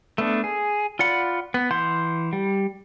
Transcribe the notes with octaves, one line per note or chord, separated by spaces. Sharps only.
A3 B3 D4
G#4
F4 D5 F#5 B5
B3
E3 F#5 C6 G6
G3